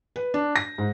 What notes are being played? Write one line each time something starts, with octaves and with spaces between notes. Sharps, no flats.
B4
D4
A#6
G#2